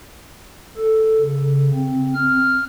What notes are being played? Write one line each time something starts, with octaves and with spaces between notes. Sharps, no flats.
A4
C#3
C4
F6